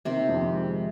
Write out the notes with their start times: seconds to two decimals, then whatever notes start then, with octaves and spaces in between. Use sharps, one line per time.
0.05 C3 D#3 C4
0.29 F2
0.52 G#3